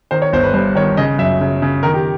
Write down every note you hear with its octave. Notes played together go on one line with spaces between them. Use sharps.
D#3 C5
C#5
G1 C5
B4
G2 C5
D#3 C#5
C#3 D#5
F#2 E5
C#3
C#3
D#3 A#4
G4